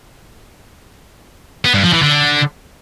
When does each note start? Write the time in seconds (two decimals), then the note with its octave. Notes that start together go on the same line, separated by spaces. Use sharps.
1.65 B3
1.74 G2
1.84 F3
1.93 E3
2.02 D3